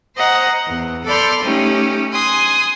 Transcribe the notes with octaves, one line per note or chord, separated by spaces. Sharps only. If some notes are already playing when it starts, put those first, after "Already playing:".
C5 D#5 F#5 A#5
E2
A4 D5 B5 C6 F6 G6
A3 C#4 D#4 G4
G#5 C6 D#6 F#6